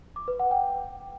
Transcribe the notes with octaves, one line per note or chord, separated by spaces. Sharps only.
D6
B4
F#5
G5